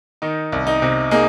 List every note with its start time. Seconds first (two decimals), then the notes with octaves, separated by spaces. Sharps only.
0.22 D#3 D#4
0.52 C2
0.67 D#4
0.82 C3
1.11 A#3 D#4 G#4